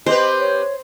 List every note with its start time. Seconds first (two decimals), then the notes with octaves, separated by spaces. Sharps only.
0.06 C4 G4 B4 C5 D#5
0.40 C#5